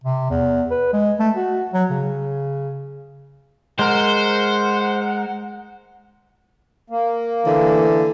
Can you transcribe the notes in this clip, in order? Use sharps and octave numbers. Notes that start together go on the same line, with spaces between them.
C3
E2
B4
G#3
A3
F#4
F#3
C#3
G#3 A#4 C5 F#5
A#3
D3 E3